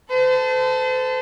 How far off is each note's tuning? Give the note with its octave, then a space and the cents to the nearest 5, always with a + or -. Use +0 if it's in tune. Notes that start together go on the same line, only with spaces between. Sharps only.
A4 +0 C5 -40